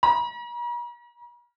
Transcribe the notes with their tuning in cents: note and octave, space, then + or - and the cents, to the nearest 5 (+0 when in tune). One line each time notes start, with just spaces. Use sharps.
A#5 +45